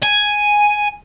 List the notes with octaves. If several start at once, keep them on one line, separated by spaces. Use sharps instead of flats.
G#5